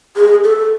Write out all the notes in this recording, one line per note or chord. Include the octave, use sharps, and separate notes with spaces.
G#4
A4